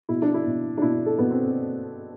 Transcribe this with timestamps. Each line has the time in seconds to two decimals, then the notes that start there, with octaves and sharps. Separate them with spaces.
0.09 B2 E4
0.22 D4
0.34 E4
0.46 B2
0.77 D4
0.82 B2 E4
1.06 A4
1.18 B2 B3
1.31 C4